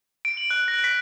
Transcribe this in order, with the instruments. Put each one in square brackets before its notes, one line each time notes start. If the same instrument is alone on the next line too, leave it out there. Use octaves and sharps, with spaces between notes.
[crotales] D7
F#7
F#6
A#6
B6